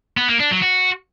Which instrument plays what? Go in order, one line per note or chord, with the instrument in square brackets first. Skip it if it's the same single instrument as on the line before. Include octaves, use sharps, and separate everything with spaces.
[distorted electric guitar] B3
A#3
D4
F#3
F#4